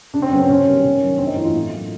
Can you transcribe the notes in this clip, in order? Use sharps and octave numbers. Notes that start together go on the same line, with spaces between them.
C#3 D4
C4
F#3 B3 C#4
C4
C3 C#4
D#3 G3 B3
C3
D#3 F#3
G2 C4
D#4
E3 A3 E4
F4
A2
F#3 A#3